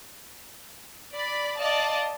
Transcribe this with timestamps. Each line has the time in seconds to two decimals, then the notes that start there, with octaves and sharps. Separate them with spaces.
1.15 D5 B5
1.59 D5 D#5 F5 A5